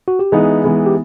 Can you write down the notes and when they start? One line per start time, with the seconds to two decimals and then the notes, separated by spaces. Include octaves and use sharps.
0.08 F#4
0.19 G4
0.32 E3 G#3 B3 D#4 G#4
0.63 E3 G#3 B3 D#4
0.86 G4